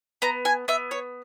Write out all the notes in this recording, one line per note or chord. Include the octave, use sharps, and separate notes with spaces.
B3 A#5
G#5
B3 E5
C#5